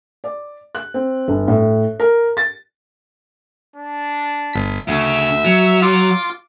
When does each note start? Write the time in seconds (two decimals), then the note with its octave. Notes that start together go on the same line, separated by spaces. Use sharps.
0.24 D5
0.75 F#6
0.94 C4
1.28 G1
1.48 A2
2.00 A#4
2.37 A6
3.76 D4
4.54 G1 B6
4.88 D2 C#3 E5
5.45 F#3
5.82 F4 D6